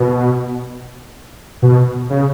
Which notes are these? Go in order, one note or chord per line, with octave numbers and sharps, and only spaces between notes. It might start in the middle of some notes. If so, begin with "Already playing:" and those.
Already playing: B2
B2
C#3